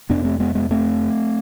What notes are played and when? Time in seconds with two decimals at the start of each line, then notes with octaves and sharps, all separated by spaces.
0.10 F2 C3 B3 D4
0.24 A3 C4
0.40 G#3 B3
0.55 G#3 B3
0.71 A3 C4